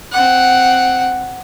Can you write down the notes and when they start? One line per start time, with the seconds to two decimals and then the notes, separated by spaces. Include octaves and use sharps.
0.12 C4 F#5